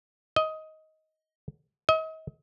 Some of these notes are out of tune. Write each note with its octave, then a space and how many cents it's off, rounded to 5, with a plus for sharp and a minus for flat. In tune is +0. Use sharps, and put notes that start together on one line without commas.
D#5 +15
D#5 +40